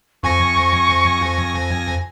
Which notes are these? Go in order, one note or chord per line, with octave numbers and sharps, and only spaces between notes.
F2 G#5 C#6 A#6